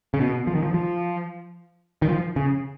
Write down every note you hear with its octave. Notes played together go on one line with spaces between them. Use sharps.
C#3
B2
F3
D#3
F3
F3
D#3
F3
C#3